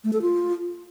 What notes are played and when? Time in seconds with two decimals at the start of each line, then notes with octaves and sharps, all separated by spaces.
0.04 A3
0.13 A4
0.22 F4